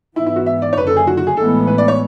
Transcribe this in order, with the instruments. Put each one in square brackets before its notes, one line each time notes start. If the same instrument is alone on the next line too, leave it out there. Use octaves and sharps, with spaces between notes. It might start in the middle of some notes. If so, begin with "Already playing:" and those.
[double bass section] G#2 E3 B3 [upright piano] E4
[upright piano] E4
F#4
E5
D5
C#5
[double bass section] F#1 F#2 D3 [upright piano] B4
[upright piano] A4
G#4
F#4
F#4
G#4
[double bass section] A1 A2 E3 G#3 B3 [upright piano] A4
[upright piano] B4
D5
C#5